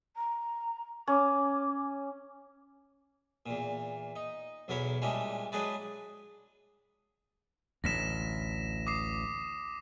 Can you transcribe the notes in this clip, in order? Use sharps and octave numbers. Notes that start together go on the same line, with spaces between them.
A#5
C#4 D6
E2 A#2
D#4
B1 E2 F#3 A#4 C#5 B5
A#2 E3 G3 G#3 C#4 D4
F#3 G#3 D4 G#4 B4 D5
A1 D2 A#6 B6 E7
D6 D#6 C7